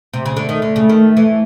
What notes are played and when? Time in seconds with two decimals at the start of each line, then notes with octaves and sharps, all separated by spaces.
0.14 C3
0.26 C#3
0.35 D3 A3
0.49 D#3
0.62 D3
0.76 C#3
0.89 D#3
1.17 E3